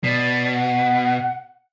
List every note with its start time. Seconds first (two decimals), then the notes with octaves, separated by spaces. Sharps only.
0.04 B2 D5
0.53 F#5